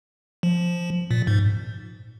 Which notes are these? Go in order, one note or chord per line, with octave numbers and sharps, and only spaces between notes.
F3
A#2
G#2